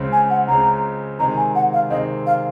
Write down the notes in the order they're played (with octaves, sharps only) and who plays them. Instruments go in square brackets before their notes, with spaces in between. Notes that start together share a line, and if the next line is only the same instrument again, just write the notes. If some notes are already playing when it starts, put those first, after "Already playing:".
Already playing: [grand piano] C#2 C#3 G#3 C4
[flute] G#5
F#5
[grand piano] C#2 C#3 G#3 C4 [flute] A#5
[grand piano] C3 D#3 G#3 C4 [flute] A#5
[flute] G#5
F#5
F5
[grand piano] C3 D#3 G#3 C4 [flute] D#5
[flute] F5